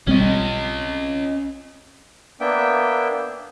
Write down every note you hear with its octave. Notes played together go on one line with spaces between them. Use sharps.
B1 G3 C4 C#4 D#5
A#3 B3 D4 E5 G5